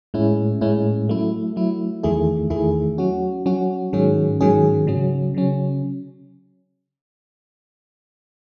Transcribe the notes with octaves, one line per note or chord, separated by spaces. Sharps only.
A2 G#3 C#4 E4
A2 G#3 C#4 E4
F#3 A3 E4
F#3 A3 E4
E2 D#3 A3 E4 G#4
E2 D#3 A3 E4 G#4
F#3 C#4 F#4
F#3 C#4 F#4
G#2 D#3 F#3 C#4 G#4
G#2 D#3 F#3 C#4 G#4
C#3 F#3 C#4
C#3 F#3 C#4